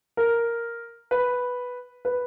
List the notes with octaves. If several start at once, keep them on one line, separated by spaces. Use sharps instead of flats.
A#4
B4
B4